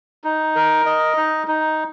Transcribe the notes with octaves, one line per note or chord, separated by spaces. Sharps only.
D#4
A#4
D#5
D#4
D#4